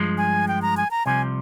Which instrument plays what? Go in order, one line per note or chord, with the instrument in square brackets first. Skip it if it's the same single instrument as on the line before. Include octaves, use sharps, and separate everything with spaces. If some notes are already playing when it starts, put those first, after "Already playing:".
Already playing: [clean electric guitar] G2 F3 G#3
[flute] G#5
G5
A#5
G#5
A#5
[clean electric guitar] C2 C3 F3 [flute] G#5